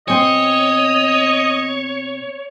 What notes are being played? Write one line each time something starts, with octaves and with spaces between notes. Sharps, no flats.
B2 C4 C#5 D#5 G#5